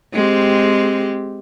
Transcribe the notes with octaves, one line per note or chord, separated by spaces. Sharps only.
G#3 C4 G4